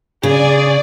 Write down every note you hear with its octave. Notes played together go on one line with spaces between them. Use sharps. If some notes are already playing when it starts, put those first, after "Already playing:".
C#3 G#4 D5